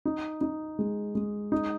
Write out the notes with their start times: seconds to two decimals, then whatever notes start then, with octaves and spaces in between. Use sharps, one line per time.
0.05 D#4
0.41 D#4
0.79 G#3
1.15 G#3
1.52 D#4